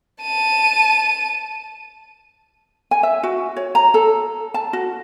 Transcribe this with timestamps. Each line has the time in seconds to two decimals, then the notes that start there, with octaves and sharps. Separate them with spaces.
0.22 A5 D#7
2.91 G#5
3.03 E5
3.23 F#4
3.57 C#5
3.75 A#5
3.94 A4
4.54 A5
4.73 F#4